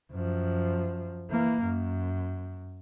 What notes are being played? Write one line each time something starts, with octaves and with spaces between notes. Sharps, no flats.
F#2 F3
E3 A#3
F#2